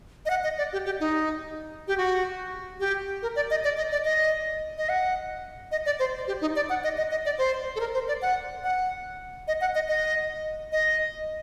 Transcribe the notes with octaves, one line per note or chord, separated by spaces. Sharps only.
D#5
F#5
D#5
D5
G4
G4
D#4
G4
F#4
G4
A#4
D5
D#5
D5
D#5
D5
D#5
D#5
F#5
D#5
D5
C5
G4
D#4
D5
F#5
D#5
D#5
D#5
D5
C5
A4
A#4
C5
D5
F#5
F#5
D#5
F#5
D#5
D#5
D#5